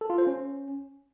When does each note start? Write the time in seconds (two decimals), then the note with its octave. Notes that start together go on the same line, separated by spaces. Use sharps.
0.01 A4
0.10 F4
0.18 C5
0.27 C#4